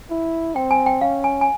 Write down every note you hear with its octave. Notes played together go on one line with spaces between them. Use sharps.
E4
C4 G5
G#5
G5
C#4 F5
G#5
G#5